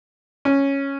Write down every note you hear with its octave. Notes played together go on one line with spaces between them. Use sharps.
C#4